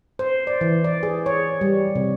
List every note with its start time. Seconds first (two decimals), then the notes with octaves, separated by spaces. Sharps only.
0.19 C5
0.47 D5
0.61 E3
0.84 D5
1.03 G#4
1.26 C#5
1.61 G3
1.95 C3